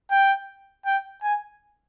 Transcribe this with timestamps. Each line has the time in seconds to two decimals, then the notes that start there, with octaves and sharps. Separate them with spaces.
0.11 G5
0.86 G5
1.22 G#5